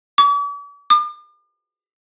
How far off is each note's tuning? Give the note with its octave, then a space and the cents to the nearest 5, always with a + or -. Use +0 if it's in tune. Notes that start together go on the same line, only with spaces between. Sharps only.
D6 -45
D6 +40